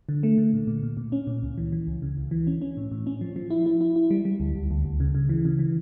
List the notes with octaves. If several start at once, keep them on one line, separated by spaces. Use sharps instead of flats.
D3
A3
D3
A#2
A#2
A#2
A#2
C#4
A#2
C#2
E3
E3
C#2
C#3
C#2
E3
C#4
C#4
A2
A2
C#4
F3
F3
E4
E4
E4
E4
G3
G3
D2
D2
D2
D2
C#3
C#3
E3
C#3
E3